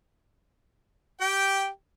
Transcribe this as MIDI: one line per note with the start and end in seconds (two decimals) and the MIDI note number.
1.21 1.67 67
1.21 1.67 79